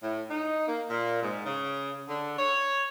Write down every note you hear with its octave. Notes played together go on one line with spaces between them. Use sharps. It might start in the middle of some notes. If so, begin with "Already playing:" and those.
A2
D#4
A#3
A#2
G#2
C#3
D3
C#5